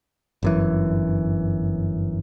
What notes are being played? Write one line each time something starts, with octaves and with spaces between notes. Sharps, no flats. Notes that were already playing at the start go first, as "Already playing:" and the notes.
G1 F#2 E3